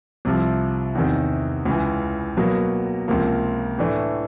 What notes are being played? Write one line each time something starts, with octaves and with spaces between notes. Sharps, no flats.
C2 C3 F3
E2 C3 D#3
C#2 C#3 E3
B2 F#3 A#3
C#2 C3 F3 A#3
A2 E3 A3 D4